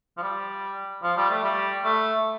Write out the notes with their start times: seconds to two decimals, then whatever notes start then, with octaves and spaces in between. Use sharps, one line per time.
0.17 F3
0.22 G3
1.03 F3
1.17 G3
1.30 A3
1.43 G3
1.84 A3